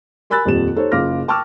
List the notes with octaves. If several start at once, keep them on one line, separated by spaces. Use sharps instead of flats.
A#4 G#5 B5 E6 F#6 A6
D#1 F2 G3 C4 E7
D#4 G4 A4 C5 C#5
F#1 C#3 F4 D6 F6 A#6
G5 A5 C#6 D6 E6 F6